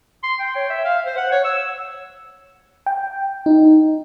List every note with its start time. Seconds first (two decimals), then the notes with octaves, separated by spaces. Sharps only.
0.24 C6
0.39 G5
0.55 C#5
0.70 E5
0.85 F5
1.06 C5
1.17 F#5
1.32 C#5
1.45 E6
2.86 G5
3.46 D#4